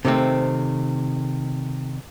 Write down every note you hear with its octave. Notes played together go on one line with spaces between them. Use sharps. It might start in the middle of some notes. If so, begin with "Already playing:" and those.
C3 D#3 A3 C4